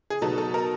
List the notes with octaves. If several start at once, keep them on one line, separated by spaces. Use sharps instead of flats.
G#4
B2 F#3 B3 D#4 A4
A4
A#4